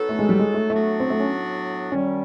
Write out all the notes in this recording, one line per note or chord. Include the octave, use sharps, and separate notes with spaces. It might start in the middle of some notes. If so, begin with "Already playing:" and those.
Already playing: F#3 B3 D#4 F#4 A4
A3
G#3
G3
G#3
A3
A2 F#3 A3 B3 D4 F#4
C4
A3
C#4
F#2 D#3 G3 C#4